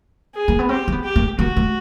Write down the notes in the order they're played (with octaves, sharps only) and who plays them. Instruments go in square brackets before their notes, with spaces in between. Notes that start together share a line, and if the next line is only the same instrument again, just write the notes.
[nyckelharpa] G#4
[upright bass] A#3
B3
[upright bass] C4 [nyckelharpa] G4
[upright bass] C4
B3
[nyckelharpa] G4
[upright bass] A#3
[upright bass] A#3 [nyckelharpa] F#4
[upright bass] A3